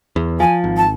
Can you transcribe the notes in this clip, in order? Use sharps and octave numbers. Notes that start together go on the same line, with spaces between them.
E2
F3 G#5
G#1
A5